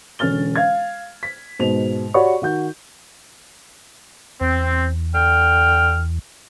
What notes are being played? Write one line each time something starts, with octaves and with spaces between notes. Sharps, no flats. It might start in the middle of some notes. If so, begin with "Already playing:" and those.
E1 D3 C#4 F6 A6 G7
F5 G#6
B6
G#2 B2 F7
F#4 G4 C#5 D5 B5 C#6
D#3 F#4 G6
E2 C4
D3 G5 F6